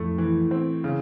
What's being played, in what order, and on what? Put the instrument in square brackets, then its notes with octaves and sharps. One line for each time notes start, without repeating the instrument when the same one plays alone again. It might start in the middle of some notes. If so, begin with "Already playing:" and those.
Already playing: [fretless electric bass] F2 [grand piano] A2 A3
[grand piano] E3
C4
C#3